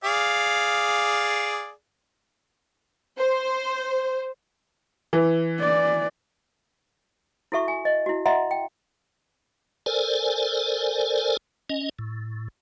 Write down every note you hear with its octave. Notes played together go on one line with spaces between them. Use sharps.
G#4 D5 F5
C5
E3
D5
E4 F#4 A4 E5 C#6
G#5
D#5
E4 F#4
D#5 E5 F#5 A#5 C6
G5
A4 A#4 C5 D5 G#5
C#4 D#5
A2